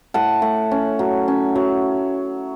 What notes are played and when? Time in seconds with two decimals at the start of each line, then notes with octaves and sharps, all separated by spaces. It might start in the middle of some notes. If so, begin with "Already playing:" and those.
0.14 A2 F#5 A5
0.42 A2
0.71 C#4
0.99 F#3
1.28 C#4
1.56 F#3